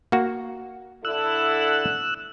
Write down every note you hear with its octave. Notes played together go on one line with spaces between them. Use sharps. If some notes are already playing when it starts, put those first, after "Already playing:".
A#3 F#4
D3 E4 A4 E6 F#6